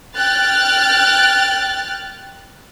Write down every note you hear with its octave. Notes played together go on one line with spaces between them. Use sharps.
G5 F6 F#6 A6